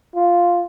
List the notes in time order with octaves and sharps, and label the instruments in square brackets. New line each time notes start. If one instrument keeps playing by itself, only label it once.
[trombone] F4